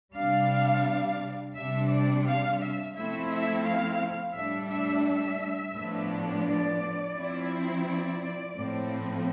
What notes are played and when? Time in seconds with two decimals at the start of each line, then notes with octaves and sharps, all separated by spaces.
0.16 C3 G3 D4 F5
1.55 C3 G3 D4 E5
1.90 D5
2.26 F5
2.61 E5
2.96 F3 A3 C4 E4 E5
3.31 E5
3.66 F5
4.36 A2 G3 D4 E5
4.71 E5
5.06 E5
5.76 A2 F3 B3 D4
6.46 D5
7.16 F3 C4 E4
7.86 D5
8.56 A2 F3 C4